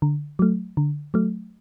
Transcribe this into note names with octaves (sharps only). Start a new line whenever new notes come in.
D3
F#3 A3
D3
F#3 A3